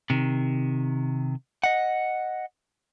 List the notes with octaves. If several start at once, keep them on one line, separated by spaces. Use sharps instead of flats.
C3 D#3
D#5 F#5